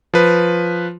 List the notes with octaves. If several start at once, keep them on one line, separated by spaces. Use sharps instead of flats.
F3 B4